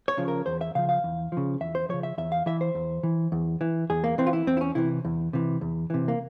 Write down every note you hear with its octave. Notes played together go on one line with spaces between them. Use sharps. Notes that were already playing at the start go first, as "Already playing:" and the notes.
C#5
C#3 F3
A#4
E2 C5
E5
C#3 F3 F5
F5
E2
C#3 F3
E2 E5
C5
C#3 F3 C#5
E5
E2 E5
F5
E3 E5
C5
E2
E3
E2
E3
E2 G#4
A#3
E3 C4
F4
E4
E2 C4
E4
C#4
C3 E3 E4
E2
C3 E3
E2
C3 E3
A#3